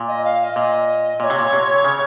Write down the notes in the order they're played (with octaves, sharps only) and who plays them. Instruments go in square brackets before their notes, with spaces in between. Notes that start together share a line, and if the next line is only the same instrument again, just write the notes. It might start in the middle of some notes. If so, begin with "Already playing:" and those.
Already playing: [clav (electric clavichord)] A#2
[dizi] D#5
F5
F5
D#5
[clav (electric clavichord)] A#2
[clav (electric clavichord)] A#2 [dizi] D#5
[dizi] C#5
[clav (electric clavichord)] C3
A#2
C3
C#3